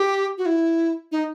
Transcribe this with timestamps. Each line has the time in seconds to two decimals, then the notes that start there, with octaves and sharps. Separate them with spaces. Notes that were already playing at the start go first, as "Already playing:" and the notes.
Already playing: G4
0.38 F#4
0.46 E4
1.12 D#4